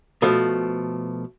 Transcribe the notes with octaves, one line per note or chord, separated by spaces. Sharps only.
B2 F3 A3